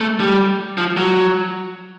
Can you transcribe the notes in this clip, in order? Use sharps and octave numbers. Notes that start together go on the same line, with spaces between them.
A3
G3
F3
F#3